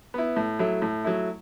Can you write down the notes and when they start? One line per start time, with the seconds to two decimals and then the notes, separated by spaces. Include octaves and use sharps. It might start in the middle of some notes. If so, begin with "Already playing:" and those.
0.14 B3 E4
0.36 A2
0.59 F#3 A3 E4
0.82 A2
1.04 F#3 A3 E4